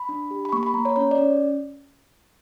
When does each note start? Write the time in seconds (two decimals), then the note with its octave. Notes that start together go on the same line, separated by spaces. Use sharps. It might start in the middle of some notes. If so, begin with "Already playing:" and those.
Already playing: B5
0.09 D4
0.31 G4
0.45 B5
0.52 A#3 C#6
0.63 B5
0.74 A#3 A#5
0.85 C#5
0.96 C#4 C#5
1.11 D5
1.18 C#4